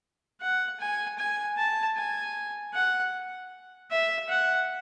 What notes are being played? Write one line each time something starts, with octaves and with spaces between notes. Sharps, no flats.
F#5
G#5
G#5
A5
G#5
F#5
E5
F#5